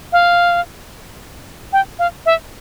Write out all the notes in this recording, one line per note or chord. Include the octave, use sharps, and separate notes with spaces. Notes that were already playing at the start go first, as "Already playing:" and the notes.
F5
G5
F5
E5